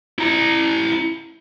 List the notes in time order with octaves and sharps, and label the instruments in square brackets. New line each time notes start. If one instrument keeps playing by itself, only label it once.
[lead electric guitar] E4 A#5